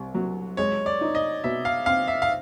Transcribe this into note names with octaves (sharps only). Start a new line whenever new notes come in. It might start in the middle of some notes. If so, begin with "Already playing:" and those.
Already playing: C2
F#3
G#3 C#5
D5
D#4
D#5
B2 E5
F5
C4 F5
E5
F5